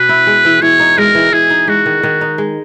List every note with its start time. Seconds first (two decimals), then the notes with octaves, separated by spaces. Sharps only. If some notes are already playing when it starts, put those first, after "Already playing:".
Already playing: B2 B4
0.09 E4
0.27 G#3
0.45 E3
0.62 E3 C#5
0.80 D#4
0.98 G#3 A#4
1.15 E3
1.33 E3 G#4
1.50 D#4
1.67 G#3 F#4
1.86 D#3
2.03 D#3
2.21 D#4
2.38 G#3